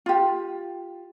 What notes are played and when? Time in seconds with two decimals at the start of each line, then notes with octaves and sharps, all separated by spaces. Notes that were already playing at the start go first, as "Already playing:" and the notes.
0.06 F4 G4